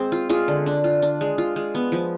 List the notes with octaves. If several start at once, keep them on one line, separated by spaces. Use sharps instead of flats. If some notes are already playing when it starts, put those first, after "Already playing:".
Already playing: G#3 C4 G#4
F4
G#3 F4
D3
D4
F4
D4
G#3
F4
G#3
B3
F3